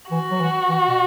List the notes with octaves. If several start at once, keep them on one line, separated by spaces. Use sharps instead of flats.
E3 F#4
F#3
E3
E3
B2